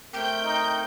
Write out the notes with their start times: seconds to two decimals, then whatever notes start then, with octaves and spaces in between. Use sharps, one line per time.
0.13 A3 C4 A#4 G5 G6
0.43 D#4